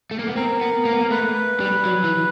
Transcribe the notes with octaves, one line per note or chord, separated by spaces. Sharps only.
A3
A#3
B3
C4 A#4
B3
A#3
B3
A#3
A3 B4
G3
F#3
E3